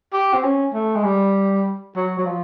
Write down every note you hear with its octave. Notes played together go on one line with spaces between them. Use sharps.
G4
C4
C#4
A3
G#3
G3
F#3
F#3
F3